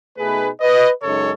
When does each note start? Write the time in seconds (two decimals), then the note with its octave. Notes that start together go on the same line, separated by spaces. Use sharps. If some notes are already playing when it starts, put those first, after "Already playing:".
0.18 B2 A3 D#4 G#4 B4
0.61 B4 D#5
1.03 F#2 C#3 G#3 D#4 A4 C#5